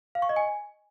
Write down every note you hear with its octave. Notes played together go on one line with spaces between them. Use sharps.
F5
C#6
D#5
G#5